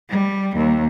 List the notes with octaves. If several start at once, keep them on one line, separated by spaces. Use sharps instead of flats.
G3
D#2